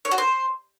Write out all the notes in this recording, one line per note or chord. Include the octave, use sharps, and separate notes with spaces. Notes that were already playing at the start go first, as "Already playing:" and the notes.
C#5
F#4
C5